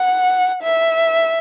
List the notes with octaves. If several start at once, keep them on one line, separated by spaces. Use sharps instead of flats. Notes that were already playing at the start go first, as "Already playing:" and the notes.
Already playing: F#5
E5